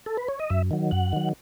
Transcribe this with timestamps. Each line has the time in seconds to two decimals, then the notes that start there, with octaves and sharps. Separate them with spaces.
0.06 A4
0.17 B4
0.28 C#5
0.39 D#5
0.50 F#2 E5
0.71 D#3 F#3
0.91 F#2 F#5
1.13 D#3 F#3